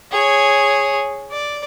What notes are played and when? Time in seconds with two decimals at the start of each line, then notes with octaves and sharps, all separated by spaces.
0.12 G#4 C#5
1.32 D5